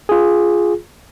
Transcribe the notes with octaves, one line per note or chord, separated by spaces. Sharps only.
F4 G#4